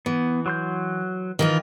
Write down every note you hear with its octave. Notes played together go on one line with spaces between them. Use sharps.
E3 B3
F#3 C6 G6
D#3 E3 F4